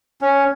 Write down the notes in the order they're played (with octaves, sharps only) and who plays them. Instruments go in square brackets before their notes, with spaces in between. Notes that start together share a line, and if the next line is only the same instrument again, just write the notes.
[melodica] C#4